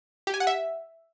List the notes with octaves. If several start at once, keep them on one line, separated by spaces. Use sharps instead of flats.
G4
G#5
F#5
E5